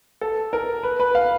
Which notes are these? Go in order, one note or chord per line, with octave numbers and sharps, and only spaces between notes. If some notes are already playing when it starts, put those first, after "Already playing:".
A4
A#4
B4
B4
F5